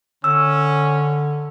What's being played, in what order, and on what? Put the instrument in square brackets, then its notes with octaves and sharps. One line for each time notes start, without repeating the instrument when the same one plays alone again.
[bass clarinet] D3 [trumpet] C#4 [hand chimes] E6